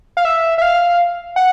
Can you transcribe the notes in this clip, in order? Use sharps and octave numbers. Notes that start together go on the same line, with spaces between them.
F5
E5
E5
F5
F#5